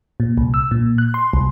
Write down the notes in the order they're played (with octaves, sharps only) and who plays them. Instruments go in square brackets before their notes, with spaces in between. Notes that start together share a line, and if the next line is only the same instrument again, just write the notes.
[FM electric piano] A#2
C2
E6
A#2
F#6
C6
C2